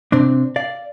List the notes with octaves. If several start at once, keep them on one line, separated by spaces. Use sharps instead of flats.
C3 C4 D4
D5 F5